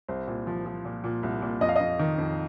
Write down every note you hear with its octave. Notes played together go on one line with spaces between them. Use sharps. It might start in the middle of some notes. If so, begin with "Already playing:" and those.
C2 C5
A#2
F3
F3
A#2
A#2
C2
A#2
F2 D#5
F5
F2 D#5
D#3
F2